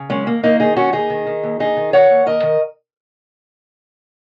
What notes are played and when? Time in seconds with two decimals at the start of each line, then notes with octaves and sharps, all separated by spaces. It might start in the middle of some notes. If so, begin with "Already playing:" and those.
Already playing: C#3
0.10 F#2 G#3 C#4
0.26 D#2 A#3
0.43 D#3 A#3 D#4
0.60 D#3 D#4 G#4
0.76 D#2 C#4 F#4
0.93 D#2 D#4 G#4
1.10 D#3
1.27 D#3
1.43 D#2
1.59 D#2 D#4 G#4
1.77 D#3
1.93 D#3 C#5 F#5
2.10 D#2
2.26 D#2 A#4 D#5
2.43 D#3